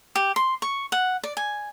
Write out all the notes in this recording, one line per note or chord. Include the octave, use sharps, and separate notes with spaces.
G4
C6
C#6
F#5
D5
G#5